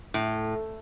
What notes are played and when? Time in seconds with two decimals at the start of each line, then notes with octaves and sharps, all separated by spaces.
0.14 A2